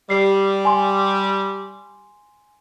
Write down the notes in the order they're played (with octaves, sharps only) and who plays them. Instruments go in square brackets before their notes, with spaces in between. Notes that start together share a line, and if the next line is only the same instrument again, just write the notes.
[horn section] G3 [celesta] C7
[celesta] G#5 C6